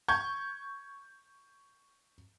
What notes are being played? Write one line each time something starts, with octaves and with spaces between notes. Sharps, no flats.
C#6 G6 G#6